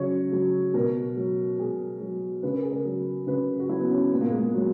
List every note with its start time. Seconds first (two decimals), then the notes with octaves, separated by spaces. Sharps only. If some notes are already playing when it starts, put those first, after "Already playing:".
Already playing: C#3 F#3 C#5
0.32 F#3
0.74 B2 A#4
1.17 F#3
1.58 B2 G#4
2.00 F#3
2.43 C#3 B4
2.53 A#4
2.62 G#4
2.71 A#4
2.85 F#3
3.27 C#3 B4
3.59 F#4
3.69 F#3 E4
3.80 B3
3.91 C#4
4.12 A#2 B3
4.21 A#3
4.30 G#3
4.38 A#3
4.54 F#3